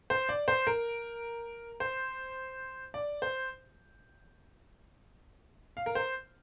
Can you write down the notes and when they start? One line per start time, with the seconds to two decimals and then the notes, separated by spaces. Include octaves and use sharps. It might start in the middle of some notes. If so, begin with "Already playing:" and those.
0.10 C5
0.29 D5
0.48 C5
0.67 A#4
1.80 C5
2.94 D5
3.22 C5
5.77 F5
5.86 A#4
5.95 C5